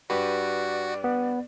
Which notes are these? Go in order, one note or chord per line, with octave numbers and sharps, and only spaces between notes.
G2 F#4 G4 B4 D5
B3